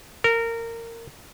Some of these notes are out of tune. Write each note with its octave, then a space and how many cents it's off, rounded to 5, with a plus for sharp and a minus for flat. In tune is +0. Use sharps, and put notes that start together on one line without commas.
A#4 -20